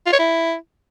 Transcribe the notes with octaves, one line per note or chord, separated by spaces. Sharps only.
F4
C#5
E4